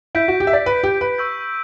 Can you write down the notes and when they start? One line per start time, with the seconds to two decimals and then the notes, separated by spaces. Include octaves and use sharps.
0.15 E4 G6 B6 D7
0.28 F#4
0.40 G4
0.47 E5
0.53 D5
0.66 B4
0.83 G4
1.01 B4
1.18 C#6 E6 G6